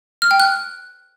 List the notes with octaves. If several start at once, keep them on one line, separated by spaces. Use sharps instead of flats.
F6
G5
F#6